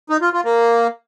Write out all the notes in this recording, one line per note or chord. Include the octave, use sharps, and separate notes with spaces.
D#4
F4
F4
A#3